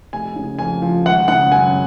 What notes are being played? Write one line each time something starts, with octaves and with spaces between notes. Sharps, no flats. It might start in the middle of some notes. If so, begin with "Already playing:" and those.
F1 G#5
C#3
F2 G#5
F3
G#1 F#5
C#3 F#5
F#2 G#5